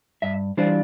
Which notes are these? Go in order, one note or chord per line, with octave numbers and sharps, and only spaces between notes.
G2 E5
E3 G3 D4 F4 C5